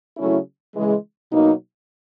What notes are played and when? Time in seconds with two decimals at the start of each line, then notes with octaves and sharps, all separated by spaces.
0.17 C#3 F#3 A3 C#4 E4
0.75 C#3 E3 G#3
1.31 B2 F#3 A#3 D#4